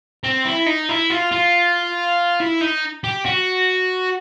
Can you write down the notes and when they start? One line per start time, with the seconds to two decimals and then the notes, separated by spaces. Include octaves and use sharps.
0.24 C4
0.45 E4
0.66 D#4
0.89 E4
1.10 F4
1.32 F4
2.40 E4
2.61 D#4
3.04 G4
3.25 F#4